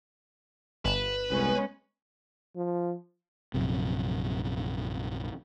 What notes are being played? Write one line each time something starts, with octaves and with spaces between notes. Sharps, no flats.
G1 B4 E7
C2 G#3 B3 C#4
F3
A#1 F#2 C3